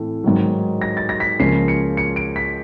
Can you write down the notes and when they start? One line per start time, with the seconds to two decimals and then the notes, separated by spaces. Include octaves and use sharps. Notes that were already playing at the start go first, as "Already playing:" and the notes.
Already playing: A2 E3 A3 C4
0.24 G#2 D#3 F#3
0.81 A#6
0.97 A6
1.09 A#6
1.20 B6
1.39 C#2 C#3 F3 A#3 C#4 C7
1.68 C#7
1.97 C#7
2.16 D7
2.36 B6